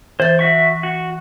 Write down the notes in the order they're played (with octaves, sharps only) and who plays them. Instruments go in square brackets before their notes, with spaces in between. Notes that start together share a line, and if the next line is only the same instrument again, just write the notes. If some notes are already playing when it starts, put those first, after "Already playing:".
[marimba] E3 A6 [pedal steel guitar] C5
[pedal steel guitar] F#4 E5 C#6
F#4